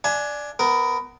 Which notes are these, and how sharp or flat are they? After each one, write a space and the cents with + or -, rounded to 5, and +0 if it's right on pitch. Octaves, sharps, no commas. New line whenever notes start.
D4 +0 E5 +45 G#5 +20
B3 +20 A#4 +0